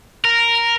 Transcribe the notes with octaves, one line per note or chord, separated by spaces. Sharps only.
A#4